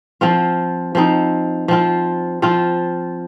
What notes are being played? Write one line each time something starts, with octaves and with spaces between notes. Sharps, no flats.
F3 C4 F4
F3 C4 D#4
F3 C4 F4
F3 C4 F4